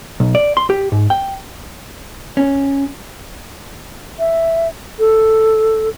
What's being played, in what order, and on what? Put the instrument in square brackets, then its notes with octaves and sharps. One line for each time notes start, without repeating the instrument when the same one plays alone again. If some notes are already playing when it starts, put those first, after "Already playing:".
[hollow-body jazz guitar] B1
D5
C6
G4
G#2
G5
C#4
[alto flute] E5
A4